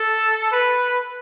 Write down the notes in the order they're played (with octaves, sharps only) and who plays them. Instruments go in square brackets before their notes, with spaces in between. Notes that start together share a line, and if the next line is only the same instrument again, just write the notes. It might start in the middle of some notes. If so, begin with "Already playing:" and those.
Already playing: [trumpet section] A4
B4